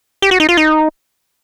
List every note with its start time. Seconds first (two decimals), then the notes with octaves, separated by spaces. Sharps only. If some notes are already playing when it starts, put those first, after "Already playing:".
0.22 G4
0.31 F#4
0.40 D#4
0.49 F4
0.57 D#4